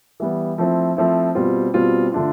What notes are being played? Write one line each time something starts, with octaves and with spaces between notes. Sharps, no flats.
E3 G3 B3
F3 A3 C4 E4
F3 A3 C4 E4
B2 G3 C4 F4
B2 G3 C4 F4
D3 A3 D4 F4